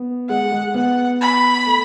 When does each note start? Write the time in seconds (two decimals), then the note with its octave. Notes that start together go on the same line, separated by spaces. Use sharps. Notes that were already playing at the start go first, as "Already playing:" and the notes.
Already playing: B3
0.29 G#3 F#5
0.52 G#3
0.74 B3 F#5
1.21 B5
1.66 A3